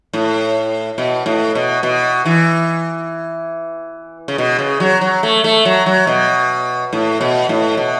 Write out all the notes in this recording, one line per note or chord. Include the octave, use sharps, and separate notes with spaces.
A2
B2
A2
B2
B2
E3
C#3
B2
C#3
F#3
F#3
A3
A3
F#3
F#3
B2
A2
B2
A2
B2